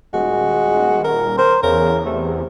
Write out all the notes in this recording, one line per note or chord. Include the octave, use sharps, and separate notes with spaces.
D#1 G#3 F#4
A#4
A#4 C5
E2 C#3 A#4
C3 A3